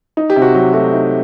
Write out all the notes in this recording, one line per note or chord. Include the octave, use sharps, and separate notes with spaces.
D#4
G4
C3
F#4
F#3 G4
A3 F#4
D#4